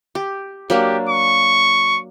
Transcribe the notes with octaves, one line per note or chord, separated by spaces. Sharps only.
G4
F#3 A#3 D4 G4
C#6